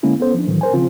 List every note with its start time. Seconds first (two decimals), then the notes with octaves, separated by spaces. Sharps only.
0.03 D3 G#3 A#3 C#4 E4
0.20 B3 C#4 A4 C5
0.34 F3 D4
0.47 A2 D#3 E3 F#3
0.61 A#4 C5 G#5
0.73 C#3 F3 C4 F4